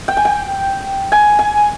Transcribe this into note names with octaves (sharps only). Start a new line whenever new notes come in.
G5
G#5
G5
G#5
G#5